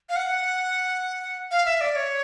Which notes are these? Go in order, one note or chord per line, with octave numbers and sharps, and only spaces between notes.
F5
F#5
F5
E5
D5
C#5